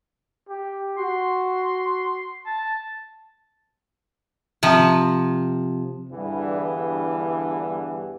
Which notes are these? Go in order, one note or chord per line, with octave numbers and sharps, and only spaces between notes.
G4
F#4 C6
A5
C3 F3
E2 G2 D3 E3 G3 B3